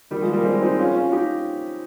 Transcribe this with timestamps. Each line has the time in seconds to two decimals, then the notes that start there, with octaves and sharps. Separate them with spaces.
0.11 D#3 G3
0.22 F3 G#3
0.33 G3 A#3
0.44 G#3 C4
0.61 C4 D#4
0.79 C#4 F4
0.95 C#4 F4
1.12 D#4 G4